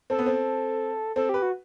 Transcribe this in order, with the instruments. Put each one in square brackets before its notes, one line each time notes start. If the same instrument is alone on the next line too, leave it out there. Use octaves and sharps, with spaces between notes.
[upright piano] C4 [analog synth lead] A4
[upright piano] B3
C4
[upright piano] C4 [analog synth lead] A4
[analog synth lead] G4 [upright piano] B4
[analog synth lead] F#4